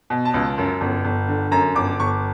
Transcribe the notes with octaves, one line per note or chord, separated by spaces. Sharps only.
B2
A5
C#2
F#2
G1
G1
D3
F#2 A#5
G1 D6
G1 C#6